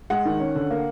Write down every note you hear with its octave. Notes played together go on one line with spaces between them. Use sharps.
G#3 F#5
D#3
C#4
D3
A#3